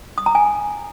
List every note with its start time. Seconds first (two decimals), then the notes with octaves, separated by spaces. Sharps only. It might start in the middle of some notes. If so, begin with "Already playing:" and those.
0.18 D#6
0.26 A#5
0.35 G#5